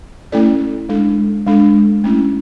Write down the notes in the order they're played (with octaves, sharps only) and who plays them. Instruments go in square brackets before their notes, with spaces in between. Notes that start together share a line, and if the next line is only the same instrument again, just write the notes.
[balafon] A3 C#4 E4 A4 D5
G#3 D4 A4
G#3 D4 A4
A3 C#4 E4